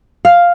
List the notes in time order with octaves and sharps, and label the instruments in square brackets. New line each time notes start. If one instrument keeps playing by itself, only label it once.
[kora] F5